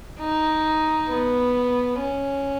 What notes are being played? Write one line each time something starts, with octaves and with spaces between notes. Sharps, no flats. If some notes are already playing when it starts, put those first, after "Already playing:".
D#4
B3
C#4